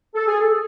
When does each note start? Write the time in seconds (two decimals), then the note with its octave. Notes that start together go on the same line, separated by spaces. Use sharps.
0.15 A4
0.28 G#4
0.41 A4